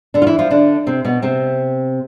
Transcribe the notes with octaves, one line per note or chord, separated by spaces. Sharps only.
D3 D4
F4
E3 E4
F3 F4
D3 D4
C3 C4
B2 B3
C3 C4